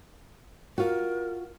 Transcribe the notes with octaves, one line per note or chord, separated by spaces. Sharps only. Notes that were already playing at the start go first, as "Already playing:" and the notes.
F4 F#4 A#4